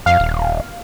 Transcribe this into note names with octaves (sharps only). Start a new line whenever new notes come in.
F2 F5
D#1